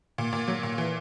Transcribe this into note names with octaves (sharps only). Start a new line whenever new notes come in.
A#2
A#2
F#3
A#2
E3